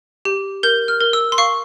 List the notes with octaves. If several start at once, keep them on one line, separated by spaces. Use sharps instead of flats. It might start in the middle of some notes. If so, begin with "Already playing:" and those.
G4
A#4 G6
F6
A#4
E6
C6
F5 C#6